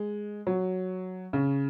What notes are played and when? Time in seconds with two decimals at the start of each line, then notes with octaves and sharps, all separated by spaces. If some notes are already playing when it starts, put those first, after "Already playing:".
Already playing: G#3
0.47 F#3
1.33 C#3